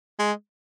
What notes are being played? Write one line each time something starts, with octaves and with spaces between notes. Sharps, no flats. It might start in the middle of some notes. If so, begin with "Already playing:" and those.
G#3